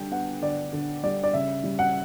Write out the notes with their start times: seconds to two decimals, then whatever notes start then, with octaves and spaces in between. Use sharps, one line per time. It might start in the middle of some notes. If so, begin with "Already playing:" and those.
Already playing: D3 G3 G5
0.11 B3 F#5
0.41 D3 D5
0.73 D3
1.03 G3 D5
1.24 D5
1.34 C#3 E5
1.63 G3
1.79 F#5